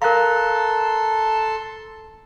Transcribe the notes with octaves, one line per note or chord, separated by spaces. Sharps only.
A4 A#4 F5 A5 A#5 C6 F#6